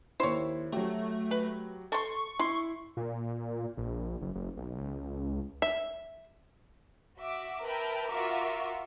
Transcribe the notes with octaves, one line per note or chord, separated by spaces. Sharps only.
D#2 E4 C5 C#5
F#3 A3 F#4 G4
B4
A4 C6 C#6
E4 C6
A#2
A#1
F#1
F#1
B1
C#2
E5
F#4 E5 D6
A#4 B4 E5 G5 A5
F4 F#4 A#4 E5 C#6 D6